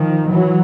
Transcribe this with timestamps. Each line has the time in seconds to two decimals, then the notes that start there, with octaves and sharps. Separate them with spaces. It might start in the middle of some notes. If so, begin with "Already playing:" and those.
Already playing: D#3 F3
0.30 E3 F#3